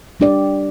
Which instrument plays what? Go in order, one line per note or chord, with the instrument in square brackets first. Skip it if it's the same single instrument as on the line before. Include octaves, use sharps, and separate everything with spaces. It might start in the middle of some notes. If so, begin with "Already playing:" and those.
[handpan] G3 D4 G4 D5